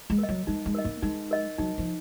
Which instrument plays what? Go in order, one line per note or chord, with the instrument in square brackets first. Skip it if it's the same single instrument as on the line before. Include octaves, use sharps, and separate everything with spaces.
[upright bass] G#3
[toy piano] A#4 D#5
[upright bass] F#3
[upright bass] G#3 [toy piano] D#4
[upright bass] G#3
[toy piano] A#4 D#5
[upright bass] A#3
[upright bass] G#3 [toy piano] D#4
[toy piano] A#4 D#5
[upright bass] F#3 [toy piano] D#4
[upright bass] F3